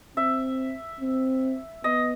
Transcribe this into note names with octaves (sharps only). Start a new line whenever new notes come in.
C4 E5
C4
B3 D#5